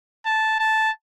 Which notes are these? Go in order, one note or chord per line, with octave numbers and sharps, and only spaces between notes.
A5
A5